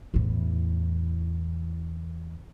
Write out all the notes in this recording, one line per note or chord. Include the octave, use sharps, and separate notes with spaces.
E2 A2